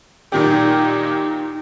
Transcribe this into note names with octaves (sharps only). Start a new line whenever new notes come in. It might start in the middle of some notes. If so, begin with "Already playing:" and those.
A#2 D#3 D#4 G4